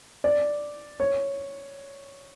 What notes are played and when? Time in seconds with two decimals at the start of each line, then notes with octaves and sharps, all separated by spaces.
0.24 D5
1.00 C#5